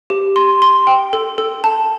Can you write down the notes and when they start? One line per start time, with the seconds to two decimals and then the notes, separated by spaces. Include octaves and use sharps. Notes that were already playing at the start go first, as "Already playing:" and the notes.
0.10 G4
0.36 C6
0.62 C6
0.87 G5
1.13 A4
1.38 A4
1.64 A5